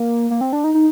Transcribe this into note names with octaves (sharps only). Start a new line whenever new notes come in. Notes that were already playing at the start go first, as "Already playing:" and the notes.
Already playing: A#3
A#3
C4
D4
D#4
D#4